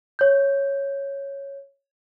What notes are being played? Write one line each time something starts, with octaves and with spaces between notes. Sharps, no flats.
C#5 G6